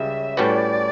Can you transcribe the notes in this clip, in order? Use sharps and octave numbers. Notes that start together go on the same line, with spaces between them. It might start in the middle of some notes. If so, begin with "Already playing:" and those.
Already playing: C#2 C#3 G3 E5
A2 G3 C#4 F#4 B4 D5